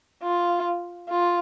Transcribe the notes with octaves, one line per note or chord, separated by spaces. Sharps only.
F4
F4